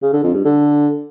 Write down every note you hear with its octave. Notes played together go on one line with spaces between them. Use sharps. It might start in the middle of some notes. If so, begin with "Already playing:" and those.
C#3
D3
F2
G2
D3